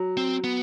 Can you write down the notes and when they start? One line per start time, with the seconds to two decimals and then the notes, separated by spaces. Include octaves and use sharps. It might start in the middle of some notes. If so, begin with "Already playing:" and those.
Already playing: F#3
0.17 C4
0.44 B3